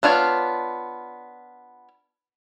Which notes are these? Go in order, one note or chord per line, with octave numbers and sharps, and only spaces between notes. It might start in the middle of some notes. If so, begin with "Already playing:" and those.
B3 D4 F4 C#5 F5